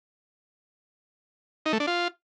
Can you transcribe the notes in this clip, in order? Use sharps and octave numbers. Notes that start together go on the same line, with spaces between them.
D#4
A3
D4
F4